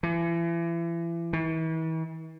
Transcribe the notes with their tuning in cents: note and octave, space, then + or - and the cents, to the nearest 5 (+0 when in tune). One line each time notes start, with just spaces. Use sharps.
E3 +35
E3 -40